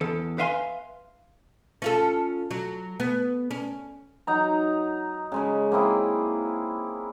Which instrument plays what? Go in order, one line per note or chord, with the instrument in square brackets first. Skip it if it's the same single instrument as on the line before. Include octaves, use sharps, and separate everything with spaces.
[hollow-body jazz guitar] E2 A4
B4 E5 F5 G#5 C6
[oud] C#4 F4 A4
F#3
B3
C#4
[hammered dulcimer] F#3 D#4 A#5
C#3 G#3 C#4
A#3 C4 E4 G#4